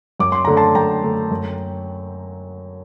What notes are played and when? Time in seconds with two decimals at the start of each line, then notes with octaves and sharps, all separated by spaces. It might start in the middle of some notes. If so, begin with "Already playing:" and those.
0.19 F#2 D6
0.32 C6
0.45 D3 A3 A#5
0.57 A5 C6
0.75 F#2 G5 A#5
1.03 D3 A3
1.31 F#2